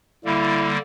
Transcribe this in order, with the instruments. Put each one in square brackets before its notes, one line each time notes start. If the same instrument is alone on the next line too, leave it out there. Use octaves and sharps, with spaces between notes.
[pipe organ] D3 G3 A#3 [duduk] E4